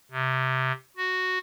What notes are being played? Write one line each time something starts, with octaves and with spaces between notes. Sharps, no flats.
C3
F#4